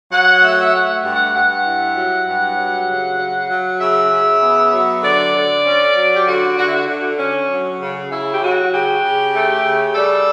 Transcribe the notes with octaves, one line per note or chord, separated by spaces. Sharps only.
F#3 F#5
A3 E5
F#5
E5
A3 F#5
G2
F#5
G2 F#5
E4
F#3
G2
F#3
C#3
F#3
F#3
C#3 E5
C#3
B3
F#3
D3 D5
D3
C#4
F#3
G4
D3 F#4
D3 F#4
E4
F#4
D3
C#4
F#3
C#3
C#3 E4
G4
F#3 F#4
C#3 G4
C#3
A3
C#3
G3 A4